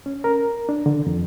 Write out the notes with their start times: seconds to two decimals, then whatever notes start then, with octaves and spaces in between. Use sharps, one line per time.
0.06 C#4
0.24 A#4
0.69 D4
0.86 D3
1.07 F2